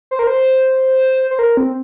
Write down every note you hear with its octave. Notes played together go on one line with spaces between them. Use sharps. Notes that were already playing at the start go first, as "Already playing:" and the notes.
C5
A#4
C5
C5
A#4
C4